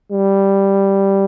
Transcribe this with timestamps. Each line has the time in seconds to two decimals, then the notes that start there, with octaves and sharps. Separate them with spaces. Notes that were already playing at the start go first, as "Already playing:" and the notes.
0.12 G3